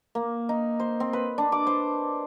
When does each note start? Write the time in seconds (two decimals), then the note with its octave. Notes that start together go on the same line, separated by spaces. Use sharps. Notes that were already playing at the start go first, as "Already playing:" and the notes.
0.15 A#3
0.49 D#4
0.80 C5
1.00 C4
1.13 B4
1.38 D4
1.52 D6
1.67 C5